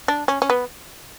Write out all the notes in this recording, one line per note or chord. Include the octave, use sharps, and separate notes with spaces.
D4
C#4
C#4
B3